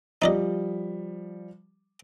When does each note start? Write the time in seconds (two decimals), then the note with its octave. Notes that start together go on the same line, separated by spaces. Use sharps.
0.22 F3 G3 D#4 D5 D#5